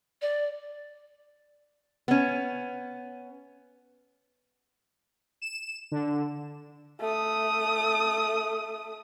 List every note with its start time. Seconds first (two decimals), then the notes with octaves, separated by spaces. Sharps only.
0.21 D5
2.08 B3 C#4
5.42 E7
5.92 D3
7.00 A3 D#6